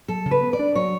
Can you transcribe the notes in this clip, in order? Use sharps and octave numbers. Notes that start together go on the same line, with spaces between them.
F#3 A4
C#3
B4
B3
D5
D4
F#3 C#5